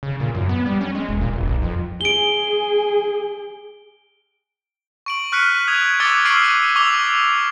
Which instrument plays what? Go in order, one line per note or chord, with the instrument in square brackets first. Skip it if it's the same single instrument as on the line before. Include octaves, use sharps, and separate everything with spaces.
[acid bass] C#3
A#2
F#2
B3
G3
C#4
G#3
E1
A#2
E1
B1
F2
[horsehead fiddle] G#4 [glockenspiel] D7 G7
[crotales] C#6 D7 F#7
C#6 F6 F#6 B6 C#7 D#7
D#6 G#6 F7
D6 E6 F#6 A6 C#7 G7
C#6 E6 F6 C7 D7 F#7
C#6 D6 E6 F7 G7